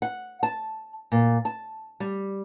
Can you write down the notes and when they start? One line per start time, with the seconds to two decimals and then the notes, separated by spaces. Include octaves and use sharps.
0.02 F#5
0.43 A5
1.12 A#2
1.45 A5
2.00 G3